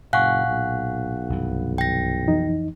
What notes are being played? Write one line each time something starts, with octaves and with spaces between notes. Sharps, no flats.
F#1 A#2 F5 F#5 G#5 C#6 F#6
B1
C2 G2 E3
G5 A#6
F2 E3 D#4